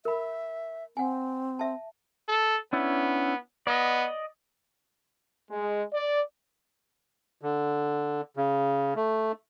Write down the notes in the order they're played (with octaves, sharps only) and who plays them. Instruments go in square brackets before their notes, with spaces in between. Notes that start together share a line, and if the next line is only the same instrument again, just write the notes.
[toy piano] A#4 B5 [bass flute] E5
[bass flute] C4 [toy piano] F#5 G#5
[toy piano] E5 A5
[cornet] A4
[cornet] B3 [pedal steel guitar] C#4 D4 E4
[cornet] B3 [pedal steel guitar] D5 D#5
[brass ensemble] G#3
D5
[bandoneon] D3
C#3
A3